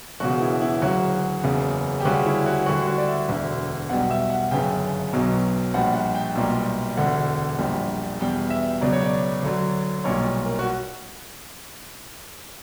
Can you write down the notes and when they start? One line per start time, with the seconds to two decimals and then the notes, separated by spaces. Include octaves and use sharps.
0.20 E1 E2 C#3 F#4
0.41 E4
0.62 E4
0.82 D2 C#3 F#3 F#4
1.44 F#1 E2 C#3
2.00 G4
2.05 D2 C#3 G3 F#4
2.26 E4
2.46 F#4
2.66 D2 D3 G3 F#4
2.87 F#4
2.98 D5
3.08 E5
3.28 E1 D2 D3
3.89 B1 B2 G3 F#5
4.11 E5
4.30 F#5
4.51 G1 F#2 C#3 G5
5.13 B1 B2 F#3
5.74 A#1 A#2 G3 F#5
5.95 F#5
6.15 G5
6.35 B1 A#2 G3
6.97 E1 D2 D3 F#5
7.58 A#1 A#2 G3
8.20 E2 B2 G3 G5
8.50 E5
8.81 C#2 B2 F#3 D5
8.93 C#5
9.04 D5
9.43 D2 D3 F#3
10.04 B1 A#2 G3 C#5
10.45 A#4
10.59 F#4